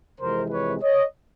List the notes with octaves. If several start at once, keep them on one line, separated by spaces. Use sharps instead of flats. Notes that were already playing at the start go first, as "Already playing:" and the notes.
F2 C3 E3 G#3 A#4 C5
B4 C#5
C#5 D#5